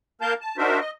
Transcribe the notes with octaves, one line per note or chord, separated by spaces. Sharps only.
A#3 A#4 F5 A5 G6
A5
D4 D#4 F#4 A#4 C5 E5
D#5